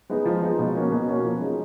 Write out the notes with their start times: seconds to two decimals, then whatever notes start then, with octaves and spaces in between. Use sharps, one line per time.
0.10 G#3 B3 D#4
0.25 F3
0.42 G#3 B3 D#4
0.59 B2
0.75 A#3 C#4 F#4
0.92 B2
1.08 A#3 C#4 F#4
1.24 F3
1.41 G#3 D#4